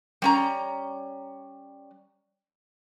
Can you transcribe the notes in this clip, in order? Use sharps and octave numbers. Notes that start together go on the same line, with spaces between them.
G3 C#4 A#5